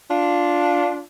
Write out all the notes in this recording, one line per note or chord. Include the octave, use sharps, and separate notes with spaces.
D4 F4